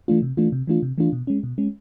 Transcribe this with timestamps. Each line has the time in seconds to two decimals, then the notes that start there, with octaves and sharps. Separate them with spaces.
0.08 E3 A3 D4 F4
0.22 C3
0.37 E3 A3 D4 F4
0.52 C3
0.67 E3 A3 D4 F4
0.82 C3
0.98 E3 A3 D4 F4
1.13 B2
1.27 G#3 C#4
1.43 B2
1.58 G#3 C#4